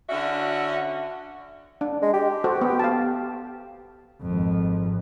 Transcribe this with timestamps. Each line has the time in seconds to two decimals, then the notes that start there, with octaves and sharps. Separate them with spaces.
0.09 D3 C#4 E4 F#4 D5 E5
1.81 D4
2.02 G#3
2.13 G4
2.44 F#4 A4 C5
2.61 B3
2.79 F5 A5
4.22 G#1 F2